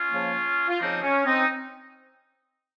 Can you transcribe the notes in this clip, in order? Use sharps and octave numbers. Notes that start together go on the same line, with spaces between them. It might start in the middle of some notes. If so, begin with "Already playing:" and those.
Already playing: C#4 F4
C#3 F3 A#3
F4
C#3 F3 A#3 C4 D#4
C#4
C4 D#4